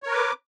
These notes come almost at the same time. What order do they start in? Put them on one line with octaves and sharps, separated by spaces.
C#5 A#4 B4 D6